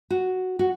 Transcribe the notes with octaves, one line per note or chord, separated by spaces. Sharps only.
F#4
F#4